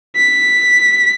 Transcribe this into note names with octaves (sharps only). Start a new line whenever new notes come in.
B6